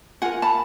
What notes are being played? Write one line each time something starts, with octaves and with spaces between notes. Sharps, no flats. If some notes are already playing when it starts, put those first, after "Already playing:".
F4 A#4 F#5 G#5
A5 B5